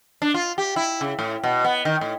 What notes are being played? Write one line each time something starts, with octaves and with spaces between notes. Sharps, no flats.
D4
F4
G4
E4
C#3
A2
B2
B3
D#3
A2